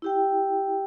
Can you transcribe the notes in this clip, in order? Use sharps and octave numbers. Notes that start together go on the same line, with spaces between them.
E4 G4 G5